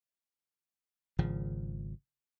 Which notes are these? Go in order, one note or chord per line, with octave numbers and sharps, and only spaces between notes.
G#1 C#3 F3